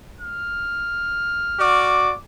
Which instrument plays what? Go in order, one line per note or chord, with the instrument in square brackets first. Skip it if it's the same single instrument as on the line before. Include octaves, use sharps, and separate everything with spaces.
[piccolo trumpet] F6
[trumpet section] F#4 D5 D6